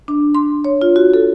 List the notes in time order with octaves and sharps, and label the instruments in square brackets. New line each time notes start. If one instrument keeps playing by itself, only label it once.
[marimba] D4
C6
C#5
F4
F#4
A4